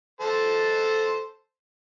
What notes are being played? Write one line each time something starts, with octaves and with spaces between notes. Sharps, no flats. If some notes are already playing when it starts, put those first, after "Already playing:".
A4 C5 A5